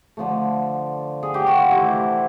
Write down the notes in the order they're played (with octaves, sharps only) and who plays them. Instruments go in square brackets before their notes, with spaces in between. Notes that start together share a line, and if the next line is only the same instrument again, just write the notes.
[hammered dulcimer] D3 F3 A3
G#4
G4
F#4
F4
C3 E3 A3 C4 E4